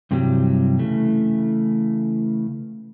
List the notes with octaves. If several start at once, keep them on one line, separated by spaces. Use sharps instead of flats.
G2 C3 E3 F#3 G3
C#3 E3 A3